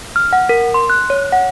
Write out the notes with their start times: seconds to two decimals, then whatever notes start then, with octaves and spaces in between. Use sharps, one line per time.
0.16 F6
0.33 F#5
0.49 A#4
0.74 C6
0.90 F#6
1.10 C#5
1.32 F#5